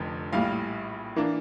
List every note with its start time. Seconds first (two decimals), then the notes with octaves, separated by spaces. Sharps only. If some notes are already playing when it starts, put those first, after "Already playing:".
Already playing: F1 F2 D3 F3
0.32 A#1 A2 G3 F5
1.16 E3 A#3 D4